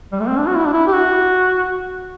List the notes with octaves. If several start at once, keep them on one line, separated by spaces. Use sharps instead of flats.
G3
A3
C4
D4
F#4
E4
D4
E4
G4
F#4